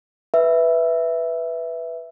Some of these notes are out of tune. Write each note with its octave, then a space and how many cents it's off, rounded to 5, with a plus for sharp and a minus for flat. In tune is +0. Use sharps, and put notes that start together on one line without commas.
B4 +0 E5 +0